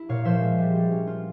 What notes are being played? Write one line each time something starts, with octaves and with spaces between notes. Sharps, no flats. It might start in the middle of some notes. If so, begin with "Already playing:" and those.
Already playing: E4
A#2 C#5 F5
F3 C5 E5
G#3
G3
G3
C#4
F4